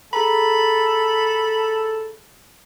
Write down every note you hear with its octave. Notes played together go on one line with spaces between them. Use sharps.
G#4 A4 A#5 B5